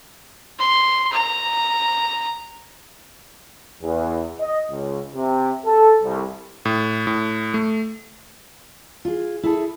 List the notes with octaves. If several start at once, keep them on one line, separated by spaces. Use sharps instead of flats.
C6
A#5
E2
D#5
C#2
C3
A4
C2
A2
A2
A3
F4 G#4
E4 G#4 A4